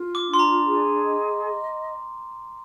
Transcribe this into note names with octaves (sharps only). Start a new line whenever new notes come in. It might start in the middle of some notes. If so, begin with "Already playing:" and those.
Already playing: F4
D6
D4
C6
A#5
G#4
D#5